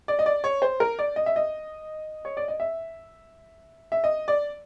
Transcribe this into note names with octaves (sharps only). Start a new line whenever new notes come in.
D5
D#5
D5
C#5
C5
A#4
D5
D#5
E5
D#5
C#5
D5
D#5
E5
E5
D#5
D5